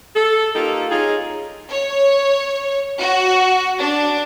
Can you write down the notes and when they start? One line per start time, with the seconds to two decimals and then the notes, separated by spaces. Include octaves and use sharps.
0.15 A4
0.54 A#3 D#4 F4 G4 A4
0.91 C#4 D#4 F4 G#4
1.70 C#5
3.00 F#4
3.79 D4